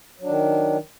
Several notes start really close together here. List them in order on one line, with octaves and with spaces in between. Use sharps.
F#3 D4 D#3